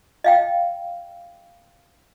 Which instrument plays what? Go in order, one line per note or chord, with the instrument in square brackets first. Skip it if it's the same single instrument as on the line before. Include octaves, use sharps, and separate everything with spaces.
[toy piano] D#5 F5 G5